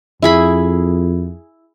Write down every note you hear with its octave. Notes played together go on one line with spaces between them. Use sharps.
F2 E4 G#4 B5